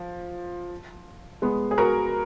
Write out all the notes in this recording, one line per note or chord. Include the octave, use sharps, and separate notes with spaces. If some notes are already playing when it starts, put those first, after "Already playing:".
Already playing: F3
G#3 B3
G#4
F#4 A#4